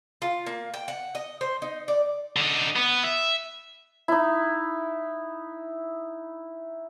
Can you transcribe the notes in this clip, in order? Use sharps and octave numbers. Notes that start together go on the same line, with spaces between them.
F4
A#3
G5
F#5
D#5
C5
D#4
D5
D3 D#4
B3
E5
D#4 E4